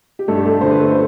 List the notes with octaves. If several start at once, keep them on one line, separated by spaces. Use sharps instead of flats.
G4
G2 A3 A4
G4
A3 A4
D3 A3 C5
B4
A3 A4
C5